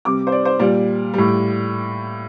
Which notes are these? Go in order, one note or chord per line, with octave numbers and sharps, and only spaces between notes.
C3 G3 D6
C5
D5
C5
A#2 G3 D5
A2 G3